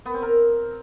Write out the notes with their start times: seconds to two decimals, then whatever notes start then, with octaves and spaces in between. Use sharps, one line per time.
0.05 B3
0.14 C4
0.22 A#4